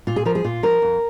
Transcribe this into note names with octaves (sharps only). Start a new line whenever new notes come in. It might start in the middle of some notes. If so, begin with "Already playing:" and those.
A#2 F4
G#4
F3 A#4
G#4
A#2 F4
F3 A#4
F2